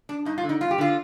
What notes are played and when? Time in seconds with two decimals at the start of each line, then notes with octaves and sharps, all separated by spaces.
0.09 D4
0.25 G2 D#4
0.38 F4
0.43 D3
0.49 D#4
0.61 G2 F4
0.71 G4
0.78 D3 F4